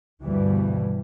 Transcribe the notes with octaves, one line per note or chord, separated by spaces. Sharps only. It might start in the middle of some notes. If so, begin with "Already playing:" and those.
D2 G2 B2 E3 G3